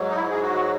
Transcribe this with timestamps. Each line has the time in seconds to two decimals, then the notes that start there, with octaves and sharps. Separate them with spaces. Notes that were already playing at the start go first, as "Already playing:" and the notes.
Already playing: G#2 F#3
0.10 D#4
0.16 E4
0.31 G#4
0.42 F#4